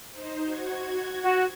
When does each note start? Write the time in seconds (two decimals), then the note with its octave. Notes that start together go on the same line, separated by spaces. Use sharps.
0.12 D#4 C5
0.43 F#4 G#6
1.23 F#4